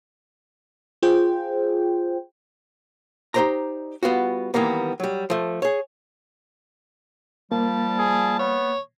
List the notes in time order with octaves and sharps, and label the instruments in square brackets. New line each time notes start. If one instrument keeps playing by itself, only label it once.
[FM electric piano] F4 G#4 C5 G5
[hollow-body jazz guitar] D#4 G4 G#4 C5 D5 A#5
G3 B3 F4 F#4
D#3 E3 G3 A#3 B3
F#3 G3
F3 A3
G#4 C#5
[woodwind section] F3 G3 [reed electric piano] A#3 [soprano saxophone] A5
[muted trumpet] G#4
[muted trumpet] B3 [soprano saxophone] C#5